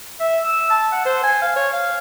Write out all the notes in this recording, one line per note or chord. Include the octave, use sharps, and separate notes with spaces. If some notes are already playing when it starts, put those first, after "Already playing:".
E5
E6
A5
F#5
C5
G#5
F5
C#5
F5